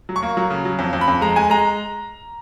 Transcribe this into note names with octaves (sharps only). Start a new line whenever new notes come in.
F#3
C#6
A#3
F#3
C#3
F#3
F2
F2
B5
F2
G#3 A#5
G#3 G#5
G#3 A#5